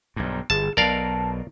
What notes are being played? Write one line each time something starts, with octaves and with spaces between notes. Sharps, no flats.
B1 G2
G1 G#4 A5
B1 B2 A#4 D5 F5 A5